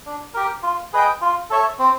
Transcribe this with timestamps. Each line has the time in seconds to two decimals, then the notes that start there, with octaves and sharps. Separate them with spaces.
0.06 D4
0.34 G4 A#4
0.63 F4
0.93 G#4 B4 D#5 G5
1.21 F4
1.50 A4 C#5 E5
1.79 C4